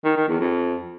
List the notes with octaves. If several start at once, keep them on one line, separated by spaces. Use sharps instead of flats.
D#3
D#3
E2
F2